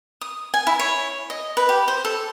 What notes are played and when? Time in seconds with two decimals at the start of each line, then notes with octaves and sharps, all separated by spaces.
0.21 D#6
0.54 G#5
0.67 E4
0.80 C#5
1.30 D#5
1.57 B4
1.69 G4
1.88 C5
2.05 A4